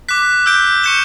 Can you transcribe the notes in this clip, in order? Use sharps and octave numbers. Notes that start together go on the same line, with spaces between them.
D6 F#6 B6
E6 G6 D7 G7
C#6 G6 C#7 E7 G7